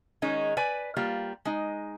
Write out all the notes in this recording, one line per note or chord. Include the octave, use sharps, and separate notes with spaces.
D#3 G#3 C#4 D#4
B4 D5 G#5
G3 A#3 F4
G#3 D#4